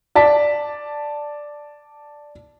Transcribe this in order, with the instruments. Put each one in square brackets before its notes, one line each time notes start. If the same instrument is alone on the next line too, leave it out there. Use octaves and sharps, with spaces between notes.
[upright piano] D5 A5 B6